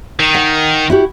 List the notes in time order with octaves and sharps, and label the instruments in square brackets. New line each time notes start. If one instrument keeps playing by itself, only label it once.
[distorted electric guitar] D#3
[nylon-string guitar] F#5
E4 F#4 G4